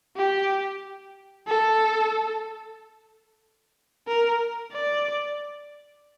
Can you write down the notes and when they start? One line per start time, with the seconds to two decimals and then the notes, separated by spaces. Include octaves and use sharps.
0.16 G4
1.47 A4
4.08 A#4
4.72 D5